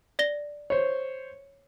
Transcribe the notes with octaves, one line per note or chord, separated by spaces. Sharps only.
D5 A#6 G7
C5 C#5